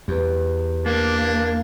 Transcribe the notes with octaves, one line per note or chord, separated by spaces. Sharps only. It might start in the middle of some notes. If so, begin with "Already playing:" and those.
E2 G4 B4
A#3 D4